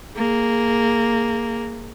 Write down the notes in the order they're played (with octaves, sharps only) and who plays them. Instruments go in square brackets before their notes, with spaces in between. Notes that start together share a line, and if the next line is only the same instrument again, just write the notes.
[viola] A#3 G#4